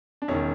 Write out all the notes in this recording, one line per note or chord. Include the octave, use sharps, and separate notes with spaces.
D4
E1 D#3 C#4